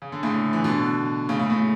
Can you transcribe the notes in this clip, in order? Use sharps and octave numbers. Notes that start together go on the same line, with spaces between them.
C#3
D3
A2 C#3
E3
B2 D3
A2 C#3
A2 C#3
A2 C#3